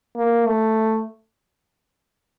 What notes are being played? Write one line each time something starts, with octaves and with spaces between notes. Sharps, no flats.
A#3
A3